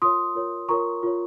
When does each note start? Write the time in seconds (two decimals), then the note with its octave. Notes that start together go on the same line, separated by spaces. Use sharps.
0.02 F4 A#4 C#5 C6 D#6
0.35 F4 A#4 C#5
0.69 F4 A#4 C#5 A#5 C#6
1.03 F4 A#4 C#5